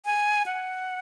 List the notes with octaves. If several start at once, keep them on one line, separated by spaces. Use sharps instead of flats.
G#5
F#5